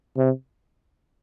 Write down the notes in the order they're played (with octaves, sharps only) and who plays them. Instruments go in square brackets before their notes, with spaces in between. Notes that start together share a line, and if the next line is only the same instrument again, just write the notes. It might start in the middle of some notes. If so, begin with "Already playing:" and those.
[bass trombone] C3